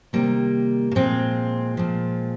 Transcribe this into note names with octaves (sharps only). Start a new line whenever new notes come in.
C3 D#3 G3 A#3
A#3
A#2 F3 G#3 C4
A#2 F3